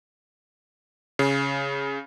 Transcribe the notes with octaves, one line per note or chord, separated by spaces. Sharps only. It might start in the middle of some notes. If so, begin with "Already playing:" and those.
C#3